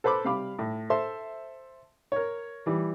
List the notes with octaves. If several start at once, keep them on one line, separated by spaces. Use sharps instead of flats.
A4 B4 C5 B5 D6
C3 G3 F5 B5 D6
A2
A4 C5 E5 C6
A#4 C#5
E3 G3